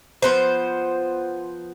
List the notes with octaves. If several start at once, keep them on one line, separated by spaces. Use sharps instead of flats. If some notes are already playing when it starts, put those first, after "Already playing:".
F3 B3 C5